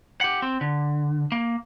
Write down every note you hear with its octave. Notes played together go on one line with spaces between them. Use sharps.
G4 F#5
C4
D3
A#3